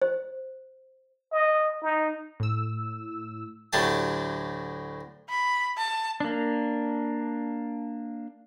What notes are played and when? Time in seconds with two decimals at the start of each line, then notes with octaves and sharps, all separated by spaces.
0.02 C5
1.32 D#5
1.83 D#4
2.40 A2 E6
3.73 D2 A2 F#3 D4 G4 A5
5.30 B5
5.78 A5
6.20 A#3 D4